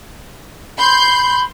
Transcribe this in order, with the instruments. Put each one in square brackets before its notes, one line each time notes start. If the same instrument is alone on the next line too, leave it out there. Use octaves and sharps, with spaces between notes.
[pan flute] B5 [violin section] C6 G6